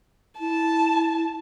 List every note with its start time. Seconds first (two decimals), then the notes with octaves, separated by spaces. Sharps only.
0.40 E4 A5